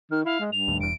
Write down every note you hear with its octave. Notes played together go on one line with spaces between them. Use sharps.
D#3 F6
E4 F5
G#3
G2 F7
D#2 A2
E1 E2 D7